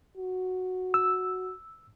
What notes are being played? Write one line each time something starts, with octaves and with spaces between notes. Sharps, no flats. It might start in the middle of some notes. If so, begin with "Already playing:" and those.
F#4
E6